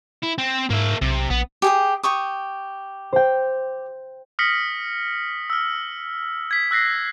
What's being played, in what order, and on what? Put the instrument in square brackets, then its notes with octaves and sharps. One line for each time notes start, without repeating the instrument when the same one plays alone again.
[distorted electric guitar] E4
C4
[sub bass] G#2 [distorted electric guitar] A#3 E5
[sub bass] B1 [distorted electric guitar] C3
[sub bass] A#1 [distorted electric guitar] B3
[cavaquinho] G4 G#4 D#6
G4 C#6 D#6
[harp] C5 G5
[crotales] D#6 F6 A#6 B6 C#7 F#7
E6 F6
G#6 B6
E6 F#6 A#6 C7